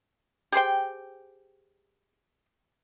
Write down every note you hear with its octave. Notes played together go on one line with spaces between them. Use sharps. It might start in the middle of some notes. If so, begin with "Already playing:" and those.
G4 G#4 C5 G5